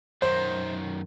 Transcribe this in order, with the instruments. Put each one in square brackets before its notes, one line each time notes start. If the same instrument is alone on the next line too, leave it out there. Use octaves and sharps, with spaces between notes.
[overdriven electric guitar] F#2 D#3 [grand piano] C5